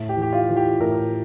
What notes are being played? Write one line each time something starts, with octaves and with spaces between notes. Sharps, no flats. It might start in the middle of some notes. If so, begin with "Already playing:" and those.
Already playing: A2
G4
E3
G4
F4
E3
G4
A2 A#4